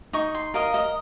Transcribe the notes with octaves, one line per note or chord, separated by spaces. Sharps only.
D#4 C#6
C6
A#4 D#5 F5
D#5